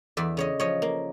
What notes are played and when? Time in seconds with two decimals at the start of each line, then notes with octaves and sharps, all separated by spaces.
0.17 E2 D5 E5
0.37 C#3 C#5 D#5
0.60 F3 C#5 D#5
0.82 A#3